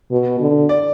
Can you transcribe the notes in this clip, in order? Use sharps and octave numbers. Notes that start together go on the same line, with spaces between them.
B2
D3
D5